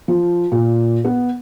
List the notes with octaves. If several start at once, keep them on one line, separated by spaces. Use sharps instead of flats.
F3
A#2
B3